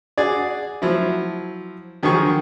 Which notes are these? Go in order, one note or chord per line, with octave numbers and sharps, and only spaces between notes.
F#4 G#4 D5
F3 F#3 E4
D3 D#3 F3 F#3 G#4 C#6